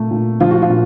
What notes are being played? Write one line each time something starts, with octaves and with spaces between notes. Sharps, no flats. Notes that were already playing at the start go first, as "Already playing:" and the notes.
Already playing: A#2 A3
A#2
F3 F4
F#4
F4
A#2